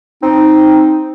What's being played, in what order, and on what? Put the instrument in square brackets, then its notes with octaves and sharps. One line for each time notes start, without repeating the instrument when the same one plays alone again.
[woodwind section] C4 D#4